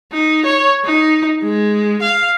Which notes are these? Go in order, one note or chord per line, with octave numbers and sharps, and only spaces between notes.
D#4
C#5
D#4
G#3
F5